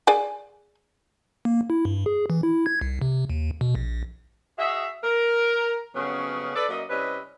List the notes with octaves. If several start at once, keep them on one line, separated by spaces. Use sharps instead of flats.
G#4 D5 G#5
A#3
E4
G2
G#4
E3
E4
G#6
C2
C3
D#2
B2
A#1
F#4 G#4 D#5 E5
A#4
F2 C#3 F#3 A3 B3 C#4
D4 A4 B4 D5
F#2 A#3 D#5
C3 G3 C#4 E4 B4 D#5